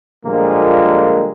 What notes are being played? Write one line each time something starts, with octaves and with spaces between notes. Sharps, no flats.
A#2 D3 F3 G3 G#3 A#3